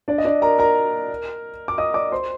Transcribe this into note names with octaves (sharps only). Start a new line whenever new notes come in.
D4 D5
D#5
D4 D5
A#4 A#5
A#4 A#5
D6
D#5 D#6
D5 D6
C5 C6